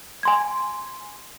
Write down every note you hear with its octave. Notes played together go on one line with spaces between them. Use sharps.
G#5 C6 G#6